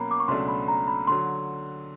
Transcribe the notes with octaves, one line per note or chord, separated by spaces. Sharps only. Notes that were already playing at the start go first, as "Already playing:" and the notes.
Already playing: B2 F#3 A#3 C#4 A#5 B5
D6
C#6
C#2 B2 F#3 A3 D4 C6
B5
A#5
B5
D3 F#3 C6